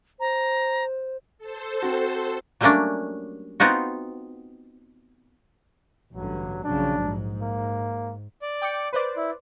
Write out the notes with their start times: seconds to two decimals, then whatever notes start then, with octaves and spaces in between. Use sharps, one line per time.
0.20 C5 A#5
1.38 A4 C5
1.82 C4 F#4
2.61 F#3 G3 A3 A#3 C#4 D4
3.60 B3 C4 D#4 F4 F#4
6.15 A1 G2 D3 F#3
6.64 A#1 C#3 F#3 D4
7.03 G#2
7.42 A#3
8.41 D5
8.62 G5 D6 C#7
8.93 B4 C5 D5
9.17 E4